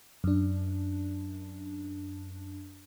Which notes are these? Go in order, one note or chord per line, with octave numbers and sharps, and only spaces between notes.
F#2 D4